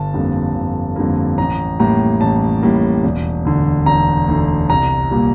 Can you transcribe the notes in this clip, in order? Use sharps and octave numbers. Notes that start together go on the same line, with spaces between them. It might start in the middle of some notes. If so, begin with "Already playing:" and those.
Already playing: G1 A5
F2 D3 G3 A#3
G1
F2 D3 G3 A#3
A1 A#5
A2 G3 A#3 A#5
A1 A5
A2 G3 A#3
E1
D2 D3
E1 A#5
D2 D3
C2 A#5
A#2 G3 A#3